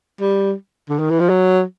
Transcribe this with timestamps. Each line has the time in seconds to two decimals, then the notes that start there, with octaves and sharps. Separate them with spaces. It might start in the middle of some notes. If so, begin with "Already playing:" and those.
0.21 G3
0.89 D3
0.99 D#3
1.10 E3
1.20 F3
1.29 F#3